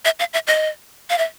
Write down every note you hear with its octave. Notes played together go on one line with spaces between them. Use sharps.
E5
F5
E5
D#5
F5
E5